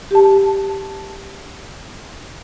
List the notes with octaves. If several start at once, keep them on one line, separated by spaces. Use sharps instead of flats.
G4 A5